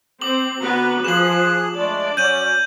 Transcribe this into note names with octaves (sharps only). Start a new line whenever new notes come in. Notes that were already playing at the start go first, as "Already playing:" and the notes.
C4 D6 F#7
D3 B3 F#4 B4 A#5
F3 G#4 F#6 E7 F#7
G#3 A3 D4 D5
F#3 C#4 G6 D#7 F#7